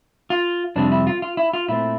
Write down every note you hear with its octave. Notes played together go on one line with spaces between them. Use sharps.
F4
F2 C3 G3 C4 D4
E4
F4
F4
E4
F4
A#2 A3 C4 E4